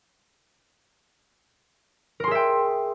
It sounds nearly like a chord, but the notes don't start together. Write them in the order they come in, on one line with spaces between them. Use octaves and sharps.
A#4 C6 G#4 E5 G5